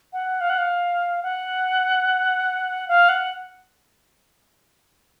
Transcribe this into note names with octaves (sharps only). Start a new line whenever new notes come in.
F#5
F5
F#5
F5
F#5
F5
F#5